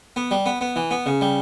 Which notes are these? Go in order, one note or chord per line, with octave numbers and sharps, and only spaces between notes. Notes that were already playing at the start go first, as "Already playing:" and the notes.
B3
G3
B3
B3
E3
B3
C#3
G3